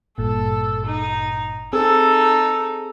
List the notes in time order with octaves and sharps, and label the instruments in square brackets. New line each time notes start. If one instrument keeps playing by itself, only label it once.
[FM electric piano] G#1 G2 A#2 [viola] A4
[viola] D#4
[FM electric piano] C4 G#4 E6 [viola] D#4 A4